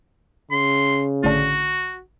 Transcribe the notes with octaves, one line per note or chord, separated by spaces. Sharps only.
C#3 C6
A1 D3 F#4